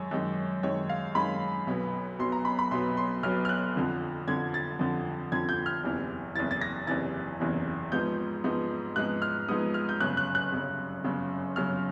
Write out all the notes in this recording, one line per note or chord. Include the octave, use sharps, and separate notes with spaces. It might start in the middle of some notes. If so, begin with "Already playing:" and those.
Already playing: F#2 D#3 G#3 C#5
F#2 D#3 G#3
F#2 D#3 G#3 C#5
F5
F#2 D#3 G#3 B5
B1 B2 F#3 B3
B1 B2 F#3 B3 C6
A#5
B5
B5
B1 B2 F#3 B3 C6
C6
B1 B2 F#3 B3 F6
F6
F#6
F2 D3 F3
F2 D3 F3 G#6
A6
F2 D3 F3
F2 D3 F3 G#6
G6
F6
F#1 E2 C3 E3
F#1 E2 C3 E3 A6
A6
A#6
F#1 E2 C3 E3 A6
F#1 E2 C3 E3
G#2 F3 G#3 B3 G6
G#2 F3 G#3 B3
G#2 F3 G#3 B3 F#6
F6
G#2 F3 G#3 B3 D#6
F6
G6
G1 F#2 C#3 F#6
F#6
F#6
G1 F#2 C#3
G1 F#2 C#3
G1 F#2 C#3 F6